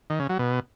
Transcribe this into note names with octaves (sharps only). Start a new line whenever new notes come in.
D#3
C#3
F#3
B2